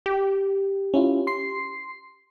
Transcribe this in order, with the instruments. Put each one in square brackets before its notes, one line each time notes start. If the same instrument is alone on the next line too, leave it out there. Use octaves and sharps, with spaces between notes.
[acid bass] G4
[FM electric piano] C#4 E4 F4
C6 C7